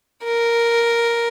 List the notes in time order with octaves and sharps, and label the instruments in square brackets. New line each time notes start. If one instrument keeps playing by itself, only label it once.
[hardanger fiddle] A#4